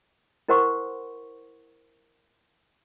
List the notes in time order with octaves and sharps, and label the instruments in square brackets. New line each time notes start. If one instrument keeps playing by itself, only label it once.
[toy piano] E4 A#4 C5 F#5 C6 C#6